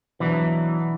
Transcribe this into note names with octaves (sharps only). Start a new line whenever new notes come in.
B2 E3 F#3 D4